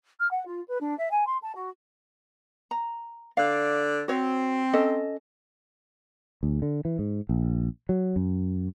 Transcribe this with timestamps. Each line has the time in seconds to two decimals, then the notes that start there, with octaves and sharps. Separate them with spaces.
0.20 F6
0.31 F#5
0.46 F4
0.68 B4
0.81 D4
0.99 E5
1.11 G#5
1.27 C6
1.43 A5
1.55 F#4
2.71 A#5
3.37 D3 D5 F5
4.08 C4 F#4 C#5
4.73 C#4 A4 D#5
6.43 D2
6.62 D3
6.85 E3
6.99 G#2
7.29 A#1
7.89 F#3
8.16 F#2